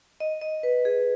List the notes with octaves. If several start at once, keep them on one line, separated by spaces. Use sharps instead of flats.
D#5
D#5
B4
G#4